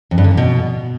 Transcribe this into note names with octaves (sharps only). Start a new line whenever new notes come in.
F2
G2
D3
E2
B2